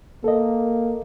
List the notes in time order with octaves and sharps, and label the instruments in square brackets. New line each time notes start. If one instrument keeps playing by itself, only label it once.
[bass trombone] A#3 [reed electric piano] A4 D#5